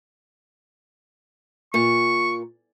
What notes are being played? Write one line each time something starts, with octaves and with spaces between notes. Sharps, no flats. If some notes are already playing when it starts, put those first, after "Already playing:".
A#2 C#6